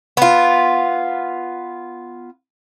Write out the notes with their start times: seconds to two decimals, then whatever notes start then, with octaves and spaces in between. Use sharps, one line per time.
0.17 B3 F4